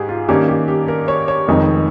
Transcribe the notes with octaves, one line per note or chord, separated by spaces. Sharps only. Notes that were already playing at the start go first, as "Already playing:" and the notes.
Already playing: G#2 G4 G#4
F4
G2 D#3 A#3 C#4 G4
G4
G4
A#4
C#5
C#5
F1 F2 D#3 G#3 D#4